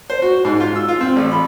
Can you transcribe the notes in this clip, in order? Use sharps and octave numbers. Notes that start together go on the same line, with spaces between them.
C5
F#4
G#2
F4
E6
F4
C4
A1
B5